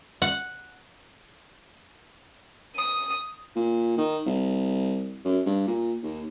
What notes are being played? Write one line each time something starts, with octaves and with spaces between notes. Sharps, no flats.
F#5
D#6
A#2
D#3
C2
F#2
G2
A#2
D#2